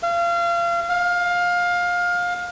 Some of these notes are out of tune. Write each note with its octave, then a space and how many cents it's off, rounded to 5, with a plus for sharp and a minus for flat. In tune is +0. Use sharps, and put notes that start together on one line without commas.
F5 -30
F5 +20